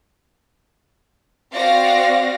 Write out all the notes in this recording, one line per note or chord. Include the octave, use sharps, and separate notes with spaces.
C4 F#4 D5 F5 A#6